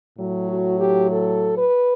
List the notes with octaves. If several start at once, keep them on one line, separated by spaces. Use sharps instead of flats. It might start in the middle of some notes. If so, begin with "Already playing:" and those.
A2 F#3
F#4
G4
A4
B4